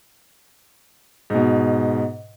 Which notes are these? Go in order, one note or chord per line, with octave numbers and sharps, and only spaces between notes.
G#2 B2